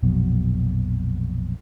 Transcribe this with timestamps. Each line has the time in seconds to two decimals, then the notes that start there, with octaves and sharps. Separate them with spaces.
0.03 A#1 F2 B2 F#3